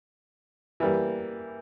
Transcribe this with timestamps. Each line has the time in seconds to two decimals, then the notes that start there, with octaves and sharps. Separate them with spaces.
0.80 E3 G3 A#3